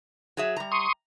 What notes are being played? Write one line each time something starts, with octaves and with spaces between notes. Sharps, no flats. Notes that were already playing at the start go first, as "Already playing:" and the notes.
F#3 G#4 E5
G3 A#5
C6 C#6 D#6